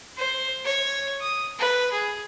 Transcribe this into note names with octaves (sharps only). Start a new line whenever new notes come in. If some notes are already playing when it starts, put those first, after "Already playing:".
C5
C#5
D#6
B4
G#4